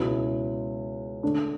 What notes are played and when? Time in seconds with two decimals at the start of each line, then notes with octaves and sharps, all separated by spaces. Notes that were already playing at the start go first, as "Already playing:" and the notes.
Already playing: C#2 B2 F#3 C#4 E4
1.23 D3 A3 D4